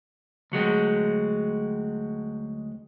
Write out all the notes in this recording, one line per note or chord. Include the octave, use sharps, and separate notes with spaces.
D2 F#3 G#3 C4